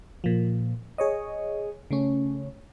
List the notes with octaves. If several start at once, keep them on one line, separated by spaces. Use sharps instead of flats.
A#2 F3
G#4 C#5 D#5
C#3 A3 C#4